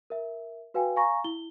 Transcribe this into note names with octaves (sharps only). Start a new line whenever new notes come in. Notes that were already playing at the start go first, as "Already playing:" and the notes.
A#4 E5
F#4 B4 F5 G5 G#5
F5 G#5 A#5 C#6 A#6
E4 G7